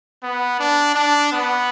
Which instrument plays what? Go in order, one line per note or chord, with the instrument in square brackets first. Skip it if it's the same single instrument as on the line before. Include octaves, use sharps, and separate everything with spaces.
[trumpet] B3
D4
D4
B3